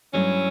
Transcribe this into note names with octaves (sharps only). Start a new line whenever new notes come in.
G2 F#3 A3 C#4 E4